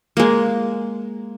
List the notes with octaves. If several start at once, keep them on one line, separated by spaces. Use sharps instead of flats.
G#3 A#3